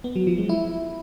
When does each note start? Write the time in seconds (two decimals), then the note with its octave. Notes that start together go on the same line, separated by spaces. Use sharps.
0.04 B3
0.16 F#3
0.27 F3
0.38 G#3
0.49 E4